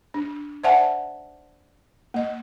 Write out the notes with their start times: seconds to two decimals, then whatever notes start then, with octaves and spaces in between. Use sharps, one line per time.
0.14 D4
0.64 C5 D5 E5 F#5 G#5 A5
2.14 A#3 D#5